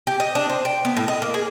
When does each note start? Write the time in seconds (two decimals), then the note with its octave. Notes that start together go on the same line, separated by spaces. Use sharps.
0.07 G4
0.20 D#5
0.35 D4
0.50 C5
0.65 G5
0.85 B3
0.97 A2
1.08 D#5
1.22 A#3
1.34 G#4